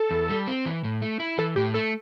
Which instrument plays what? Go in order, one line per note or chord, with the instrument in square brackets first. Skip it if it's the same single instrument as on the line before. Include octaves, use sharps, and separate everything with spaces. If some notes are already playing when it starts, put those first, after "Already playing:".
Already playing: [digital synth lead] A4
[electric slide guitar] E2
G3
C4
E3
A2
A3
E4
[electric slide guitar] E3 [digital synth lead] A4
[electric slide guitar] A2 [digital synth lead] G4
[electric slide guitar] A3 [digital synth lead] A4